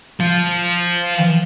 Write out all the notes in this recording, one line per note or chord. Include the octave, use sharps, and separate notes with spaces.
F3